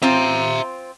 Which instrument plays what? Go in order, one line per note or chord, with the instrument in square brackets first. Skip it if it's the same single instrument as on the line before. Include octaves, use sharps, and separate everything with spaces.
[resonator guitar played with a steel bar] C4 F4 [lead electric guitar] E5 A#5